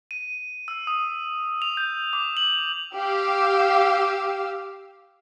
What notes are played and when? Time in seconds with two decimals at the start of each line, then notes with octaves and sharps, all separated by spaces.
0.11 D#7
0.68 E6
0.87 D#6
1.62 F7
1.77 G6
2.13 D6
2.37 F#7
2.95 G4 F5 E6